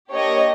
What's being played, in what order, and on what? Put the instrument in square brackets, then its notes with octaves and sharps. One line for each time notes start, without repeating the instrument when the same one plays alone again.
[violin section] A#3 D4 G4 C#5 D#5